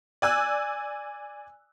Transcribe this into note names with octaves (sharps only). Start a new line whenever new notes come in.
D5 G#5 E6 F#6